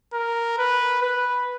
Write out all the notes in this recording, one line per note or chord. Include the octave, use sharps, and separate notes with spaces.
A#4
B4
B4